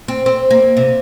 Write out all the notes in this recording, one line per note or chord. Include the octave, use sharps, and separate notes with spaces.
C4
C4
A#3
C3